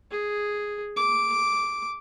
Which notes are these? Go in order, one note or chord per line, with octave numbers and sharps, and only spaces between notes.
G#4
D6